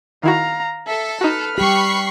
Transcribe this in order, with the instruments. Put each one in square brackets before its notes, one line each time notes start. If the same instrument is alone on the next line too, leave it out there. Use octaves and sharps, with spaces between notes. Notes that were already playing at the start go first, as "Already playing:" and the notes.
[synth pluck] D#3 E4 F#4 [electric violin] F5 A#5
[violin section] A4 [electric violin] E5
[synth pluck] D#4 F#4 [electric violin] B4 F6
[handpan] G3 G4 [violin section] B5 C#6 C7